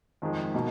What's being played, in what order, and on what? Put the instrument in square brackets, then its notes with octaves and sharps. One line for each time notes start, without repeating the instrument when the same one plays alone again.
[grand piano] F2 D#3 G#3
B2 A#3 D#4